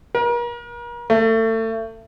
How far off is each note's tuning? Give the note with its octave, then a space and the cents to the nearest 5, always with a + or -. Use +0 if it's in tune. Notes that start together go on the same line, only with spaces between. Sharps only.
A#4 +40
A3 +30